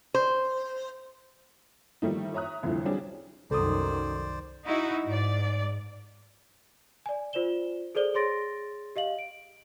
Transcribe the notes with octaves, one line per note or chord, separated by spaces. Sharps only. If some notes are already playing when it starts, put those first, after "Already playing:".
C5
D#3 F3 G3 A3 D#4
C#5 E5 A#5 D#6 F#6
C2 F2 A2 D3 E3 F3
F#3 G3 C4 D4 G#4
C2 F#2 D#3 A4 C5 D5 D#6
D#4 E4 F#4
G#2 D5
D5 G#5
F4 C5 D5 E7 G7
G#4 A4 C5 D5 G7
G#4 C#5 C6 A6 A#6 D7
G4 D#5 F5 F#7
D7